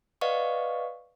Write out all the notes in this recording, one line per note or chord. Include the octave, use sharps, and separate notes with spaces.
B4 D5 D#5 F5 F#5 C#6